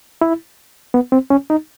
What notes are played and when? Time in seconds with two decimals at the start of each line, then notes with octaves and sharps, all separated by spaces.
0.21 E4
0.94 B3
1.12 C4
1.30 C#4
1.50 D#4